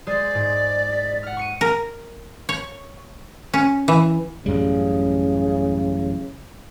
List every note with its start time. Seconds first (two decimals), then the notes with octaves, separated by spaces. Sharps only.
0.07 G#3 G#4 C5 D5
0.35 G#2
0.92 B6
1.23 F#5 F6
1.37 C#6 C#7 D#7
1.61 A#4
2.49 C#5
3.54 C#4
3.88 E3
4.46 A1 F#2 C#3 G3